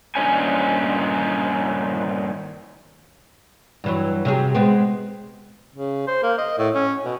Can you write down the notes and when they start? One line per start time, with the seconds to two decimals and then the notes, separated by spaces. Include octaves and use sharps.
0.15 G2 A#2 D#3 C#4 G#5
3.84 G2 E3 F#3
4.25 C3 F#3 G#4
4.54 G#3 B3 C4
5.75 C#3
6.07 C5
6.23 A#3
6.38 D#5
6.58 A2
6.75 C#4
7.05 B2